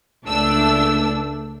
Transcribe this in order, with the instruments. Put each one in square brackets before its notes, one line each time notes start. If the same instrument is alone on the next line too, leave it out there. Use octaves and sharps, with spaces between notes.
[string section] C#2 A3 D4 E6